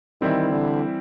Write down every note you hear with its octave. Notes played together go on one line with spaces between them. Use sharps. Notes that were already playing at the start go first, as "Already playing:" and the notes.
D#3 E3 G3 C4 E4
D3